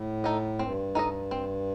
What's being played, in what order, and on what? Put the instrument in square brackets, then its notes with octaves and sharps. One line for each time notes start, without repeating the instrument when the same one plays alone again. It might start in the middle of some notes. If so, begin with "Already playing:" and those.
Already playing: [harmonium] A2
[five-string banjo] D#4 A4 D#5
[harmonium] G2 [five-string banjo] C4
[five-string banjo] D#4 A4 D#5
C4